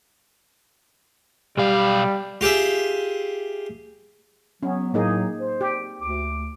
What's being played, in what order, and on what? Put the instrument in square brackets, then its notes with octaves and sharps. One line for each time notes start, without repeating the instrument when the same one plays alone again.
[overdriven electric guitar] B1 F5 [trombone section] G3
[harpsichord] F4 G4 G#4 E5
[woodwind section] F#3 B3 [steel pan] C#4
[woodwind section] A2 F#3 [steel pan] A#3 D#4 G#4
[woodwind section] C5
[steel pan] G4
[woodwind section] D2 D6